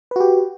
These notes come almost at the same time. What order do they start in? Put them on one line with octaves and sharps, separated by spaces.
B4 F#4 G4